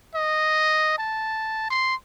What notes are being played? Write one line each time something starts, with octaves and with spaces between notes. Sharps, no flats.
D#5
A5
C6